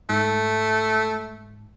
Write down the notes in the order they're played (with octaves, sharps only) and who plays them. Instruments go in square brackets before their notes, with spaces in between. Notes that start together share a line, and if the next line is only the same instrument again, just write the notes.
[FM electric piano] G#2 [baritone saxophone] A3